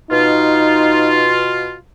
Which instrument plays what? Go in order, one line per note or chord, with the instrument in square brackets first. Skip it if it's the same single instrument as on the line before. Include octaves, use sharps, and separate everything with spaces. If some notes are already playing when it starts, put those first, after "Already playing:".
[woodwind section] B2 F4 [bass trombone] D#4